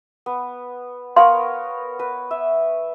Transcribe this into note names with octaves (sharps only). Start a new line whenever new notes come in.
B3
B3 A#4 C#5 F5 C6
B4
E5